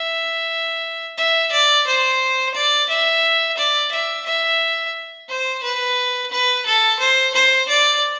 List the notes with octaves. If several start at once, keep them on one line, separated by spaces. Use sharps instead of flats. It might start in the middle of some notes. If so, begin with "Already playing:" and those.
Already playing: E5
E5
D5
C5
D5
E5
D5
E5
E5
C5
B4
B4
A4
C5
C5
D5